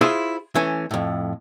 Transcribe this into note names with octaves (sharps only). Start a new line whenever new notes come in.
E4 F4 G#4 C5 E5
E3 A3 C#4
F2 A2